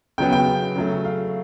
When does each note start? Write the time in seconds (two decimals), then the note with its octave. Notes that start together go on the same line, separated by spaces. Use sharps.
0.18 C#3 F#3 B3 G5
0.32 G5
0.76 C#3 F#3 A3
1.05 F5